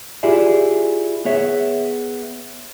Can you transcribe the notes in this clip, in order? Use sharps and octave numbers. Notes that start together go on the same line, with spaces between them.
E4 F4 G4 G#4 D5 E5
B3 G#4 C#5 E5